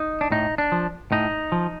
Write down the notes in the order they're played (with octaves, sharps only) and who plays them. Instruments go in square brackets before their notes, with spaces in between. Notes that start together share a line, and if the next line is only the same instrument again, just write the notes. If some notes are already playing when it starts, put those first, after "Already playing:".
Already playing: [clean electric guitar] D#4
D4
A2 D#4
D4
F3
A2 D#4
F3